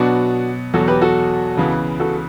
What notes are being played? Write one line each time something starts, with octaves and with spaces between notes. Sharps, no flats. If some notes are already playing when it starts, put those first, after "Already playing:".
Already playing: B2 F#3 B3 D4 F#4
E2 B2 F#3 F#4 A4
G4 B4
F#4 A4
C#2 C#3 E3 B3
F#4 A4